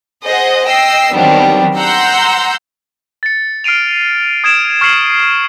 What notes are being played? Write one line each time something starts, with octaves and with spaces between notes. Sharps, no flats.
G#4 C5 D#5 F#5
D#5 G5 E6 C7
D#3 F#3 G3 B3 C4 D4
F#5 A#5 C6 E6 G6
A6 C#7
F6 C7 D7 D#7 F7
D#6 G#6 D7 E7
C#6 F6 G#6 C7 C#7 F#7